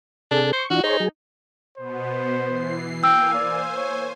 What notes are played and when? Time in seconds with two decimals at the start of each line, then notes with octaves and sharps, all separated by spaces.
0.31 C3 D4 G#4 A4
0.53 C5 C#6
0.70 E3 D4 F4 F#4
0.83 D#4 G#4 C5 C#5
1.00 F#3 G#4
1.77 B2 B3 C5
2.46 E3 C7
3.04 A#3 F5 G5 G#5 E6
3.34 C5 D5 G#5
3.77 C#5